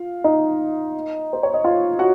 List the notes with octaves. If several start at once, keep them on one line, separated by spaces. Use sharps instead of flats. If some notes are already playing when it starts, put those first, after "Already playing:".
Already playing: F4 F5
D#4 D#5
C5
C#5
D#5
F4 F5
F#4 F#5